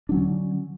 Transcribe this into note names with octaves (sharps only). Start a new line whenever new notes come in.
D3 F#3 C#4 D4